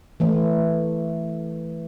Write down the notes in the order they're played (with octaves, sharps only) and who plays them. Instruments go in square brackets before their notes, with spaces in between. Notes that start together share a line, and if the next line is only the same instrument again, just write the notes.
[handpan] E3 A3